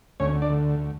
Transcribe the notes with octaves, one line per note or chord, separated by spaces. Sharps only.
D2 C#4 C#5
D4 D5
D3